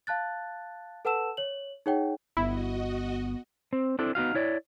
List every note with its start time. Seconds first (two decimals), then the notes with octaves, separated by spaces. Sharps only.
0.07 F5 A5 F#6 A6
1.05 A4 B4 F#5 A5 E6 E7
1.37 C#5 F#7
1.86 D#4 G#4 C#5 F#5 G5
2.37 G1 B3 E4 F#4 D#5
3.73 C4
3.99 C4 D4 E4 A4
4.15 B3 D#4 F#4 F5
4.35 E4 C#5 D5